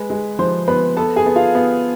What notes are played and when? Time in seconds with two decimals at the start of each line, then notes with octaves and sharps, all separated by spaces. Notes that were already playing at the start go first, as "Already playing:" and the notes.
Already playing: G#3 B4
0.10 G#3
0.39 F3 C5 C6
0.68 B3 B4 B5
0.97 B3 A4 A5
1.16 G#4 G#5
1.26 B3
1.36 F4 F5
1.55 B3